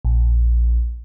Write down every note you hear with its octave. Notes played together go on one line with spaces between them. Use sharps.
A#1